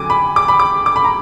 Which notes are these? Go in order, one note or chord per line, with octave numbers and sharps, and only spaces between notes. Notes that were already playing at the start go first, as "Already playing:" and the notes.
Already playing: F2 D3 F#3 G#5 D6
B5
D6
B5
D6
D6
B5
A#5